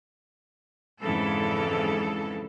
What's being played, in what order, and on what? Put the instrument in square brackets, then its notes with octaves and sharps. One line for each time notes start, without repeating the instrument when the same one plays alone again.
[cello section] F2 G#2 C#3 E3 A4